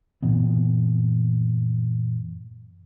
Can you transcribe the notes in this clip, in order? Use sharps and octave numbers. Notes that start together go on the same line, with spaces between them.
F#2 A#2 E3 B3